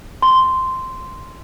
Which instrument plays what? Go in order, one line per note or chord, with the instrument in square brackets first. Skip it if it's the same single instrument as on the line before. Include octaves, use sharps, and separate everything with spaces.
[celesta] C6